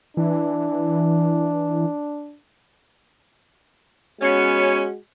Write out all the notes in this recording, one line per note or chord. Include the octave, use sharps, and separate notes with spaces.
E3 D4
G#3 B3 C#4 F#4